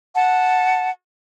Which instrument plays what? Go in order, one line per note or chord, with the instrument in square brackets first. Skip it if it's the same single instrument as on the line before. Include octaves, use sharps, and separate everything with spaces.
[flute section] F#5 A5